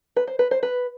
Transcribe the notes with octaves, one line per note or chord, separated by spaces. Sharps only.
B4
C5
B4
C5
B4